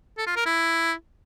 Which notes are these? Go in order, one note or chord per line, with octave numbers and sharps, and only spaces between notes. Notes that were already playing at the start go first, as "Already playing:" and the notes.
A4
F4
A#4
E4